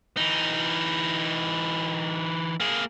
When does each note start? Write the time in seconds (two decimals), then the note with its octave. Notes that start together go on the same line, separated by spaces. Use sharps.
0.17 E3 D#4
2.60 A#3 G#4